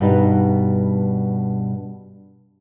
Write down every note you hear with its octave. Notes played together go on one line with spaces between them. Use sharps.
G2 B2 G3 D#4 B4